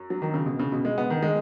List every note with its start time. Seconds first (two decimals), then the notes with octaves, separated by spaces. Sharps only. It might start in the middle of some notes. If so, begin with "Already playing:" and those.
Already playing: F#2
0.10 F#3
0.22 D#3
0.34 C#3
0.46 B2
0.59 C#3
0.72 B2
0.85 G#3
0.98 B3
1.10 D#3
1.22 G#3